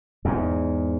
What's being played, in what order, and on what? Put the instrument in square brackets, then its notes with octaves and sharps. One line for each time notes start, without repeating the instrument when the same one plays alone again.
[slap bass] E2 G#2